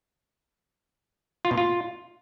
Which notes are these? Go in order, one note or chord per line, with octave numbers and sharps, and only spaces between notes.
F4
B2
F4